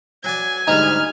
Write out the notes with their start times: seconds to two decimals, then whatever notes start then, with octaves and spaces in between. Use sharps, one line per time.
0.24 F#3 D5 G#5
0.68 D2 G#2 G3 D#4 F6